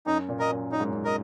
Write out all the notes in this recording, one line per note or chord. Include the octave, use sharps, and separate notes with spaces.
F#2 D#4
A#2
A#4 D#5
F#2
F#2 D#4
G#2
F#2
A#4 D#5